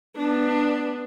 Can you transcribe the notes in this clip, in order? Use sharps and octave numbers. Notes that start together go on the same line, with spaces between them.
B3 D4